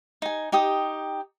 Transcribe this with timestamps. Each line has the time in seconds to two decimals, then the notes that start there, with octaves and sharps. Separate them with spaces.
0.22 D#4 G#5
0.52 D#4 G4 G5 D#6